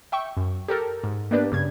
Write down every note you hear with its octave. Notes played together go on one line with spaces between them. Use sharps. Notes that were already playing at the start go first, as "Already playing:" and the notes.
E5 G5 C#6
F#2
G4 A4 A#4
G#2
A#3 B3 D4 G4 B4 D5
G2 C#3 G#6